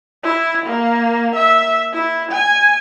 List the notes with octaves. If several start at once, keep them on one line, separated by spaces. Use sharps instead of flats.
E4
A#3
E5
E4
G#5